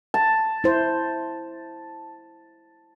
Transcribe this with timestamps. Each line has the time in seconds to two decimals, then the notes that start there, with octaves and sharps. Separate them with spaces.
0.14 A5
0.64 E4 C5